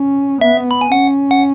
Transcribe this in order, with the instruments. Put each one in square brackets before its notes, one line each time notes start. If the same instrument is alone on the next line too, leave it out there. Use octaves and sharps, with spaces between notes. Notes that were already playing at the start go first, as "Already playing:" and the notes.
Already playing: [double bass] C#4
[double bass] B3 [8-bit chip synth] E5
[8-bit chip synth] B5
G#5
[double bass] C#4 [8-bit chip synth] F#5
[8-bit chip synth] F#5